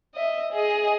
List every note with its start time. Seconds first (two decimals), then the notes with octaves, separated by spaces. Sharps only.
0.15 D#5 E5
0.52 G#4 D#5